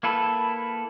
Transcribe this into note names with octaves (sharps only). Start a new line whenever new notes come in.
A#3 E4 A4 B4